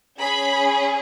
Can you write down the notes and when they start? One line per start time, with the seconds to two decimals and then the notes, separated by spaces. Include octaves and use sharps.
0.18 C#4 G#4 B5